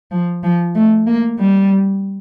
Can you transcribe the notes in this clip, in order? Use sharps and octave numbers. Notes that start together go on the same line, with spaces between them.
F3
F3
A3
A#3
G3